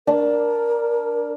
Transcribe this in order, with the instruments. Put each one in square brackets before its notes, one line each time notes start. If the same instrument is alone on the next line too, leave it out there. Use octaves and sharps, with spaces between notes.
[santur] D4 [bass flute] A#4